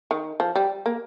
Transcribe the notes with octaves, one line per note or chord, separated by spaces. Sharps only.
D#3
F3
G3
A#3